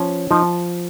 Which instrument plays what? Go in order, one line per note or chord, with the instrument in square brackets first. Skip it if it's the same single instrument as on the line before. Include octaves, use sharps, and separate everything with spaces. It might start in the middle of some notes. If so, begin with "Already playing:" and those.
Already playing: [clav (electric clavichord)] F3 C#4
F3 D#4